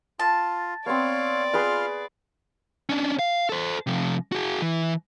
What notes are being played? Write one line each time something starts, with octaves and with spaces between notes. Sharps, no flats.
F4 A5
B3 C4 C#5 D5 F5
F4 G#4 B4 G#5 C6 F6
C#4 D4
F5
A4 C5
C3 F3
F#4 G#4
E3